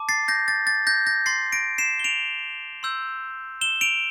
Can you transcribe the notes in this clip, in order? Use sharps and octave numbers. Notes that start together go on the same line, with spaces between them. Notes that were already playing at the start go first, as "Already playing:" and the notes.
Already playing: A5 D6
A6 C7
G6 A#6
A6
A6
G6 A#6
G6 A#6
C6 G6 A6 C7
A#6 D7
C7 E7
G7
D7 F7
C6 E6 G6
E7 G7
D7 F7